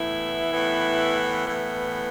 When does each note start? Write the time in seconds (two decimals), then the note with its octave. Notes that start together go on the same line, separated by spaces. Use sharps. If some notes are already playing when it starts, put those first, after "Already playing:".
Already playing: A2 E3 B3 E4
0.52 A2 E3 B3
1.45 A2 E3 B3